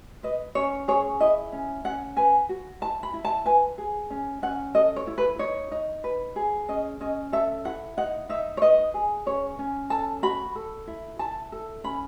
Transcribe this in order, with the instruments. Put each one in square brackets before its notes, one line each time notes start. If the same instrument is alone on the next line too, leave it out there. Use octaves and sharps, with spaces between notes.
[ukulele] B4 D#5
C#4 C#5
G#4 C#5
E4 D#5
C#4
C#4 F#5
B4 G#5
F#4
E4 A5
B5
E4
A5
B4 G#5
G#4
C#4
C#4 F#5
A4 D#5
C#5
E4
B4
D#4 C#5
D#4
B4
G#4
C#4 D#5
C#4 D#5
A4 E5
E4 F#5
D#4 F#5
D#4 E5
C#5
B4 D#5
G#4
C#4 C#5
C#4
A4 A5
F#4 B5
A4
E4
E4 A5
A4
C#4 B5